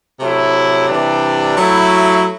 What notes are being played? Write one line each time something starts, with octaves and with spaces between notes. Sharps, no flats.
C3 F#3 A3 E4
C3 E3 G3 D4
F#3 A3 E4